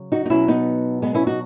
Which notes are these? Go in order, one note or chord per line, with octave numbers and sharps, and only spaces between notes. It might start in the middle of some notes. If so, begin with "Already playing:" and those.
Already playing: C#3 F#3
D#4 F#4
D#4
B2 F#3 C#4 E4
B3 D#4
G#3 B3
C#4 E4
D#4 F#4